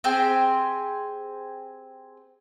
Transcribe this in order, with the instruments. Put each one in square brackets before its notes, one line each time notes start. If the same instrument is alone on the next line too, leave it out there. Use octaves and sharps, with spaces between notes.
[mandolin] C4 G4 G#4 C5